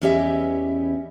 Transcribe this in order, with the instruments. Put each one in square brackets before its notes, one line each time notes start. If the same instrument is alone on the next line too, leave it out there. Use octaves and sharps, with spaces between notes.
[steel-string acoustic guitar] E2 E3 C#4 G4 D#5 E5